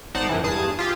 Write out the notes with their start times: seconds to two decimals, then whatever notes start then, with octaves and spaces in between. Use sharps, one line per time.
0.14 G#1 D#4 C5 D5 F#5 A5
0.29 F#2 C3 E3
0.43 E2 G2 G#4 A5 D#6
0.79 F4 G4 G#4